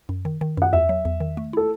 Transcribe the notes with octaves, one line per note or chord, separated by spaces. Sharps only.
F#2
D#3
D#3
F#2 F#5
E2 E5
F#3
E2
D#3
A3
E4 A4